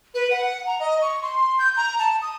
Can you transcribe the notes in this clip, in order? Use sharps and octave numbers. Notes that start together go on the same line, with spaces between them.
B4
F#5
A#5
D#5
C#6
C6
G6
A#5
A5
D#6